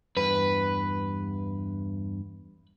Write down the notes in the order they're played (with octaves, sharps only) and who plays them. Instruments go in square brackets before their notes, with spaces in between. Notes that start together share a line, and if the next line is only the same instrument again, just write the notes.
[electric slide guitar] E2 G2 [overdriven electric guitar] B4